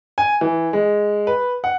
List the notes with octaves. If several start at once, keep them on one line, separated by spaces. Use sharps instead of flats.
G#5
E3
G#3
B4
F#5